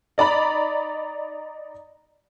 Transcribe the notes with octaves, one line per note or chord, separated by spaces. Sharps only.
D#4 D5 A#5 B5